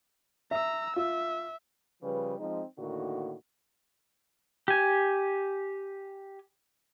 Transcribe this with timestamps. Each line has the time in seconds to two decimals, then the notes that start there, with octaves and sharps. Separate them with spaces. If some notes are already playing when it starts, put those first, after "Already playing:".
0.51 E5 A#5 E6
0.96 F4 E5
2.03 C#3 F3 G3 B4
2.39 F3 G#3 C4 D#4 D#5
2.78 A2 D3 D#3 A#3 F#4
4.68 G4 G#5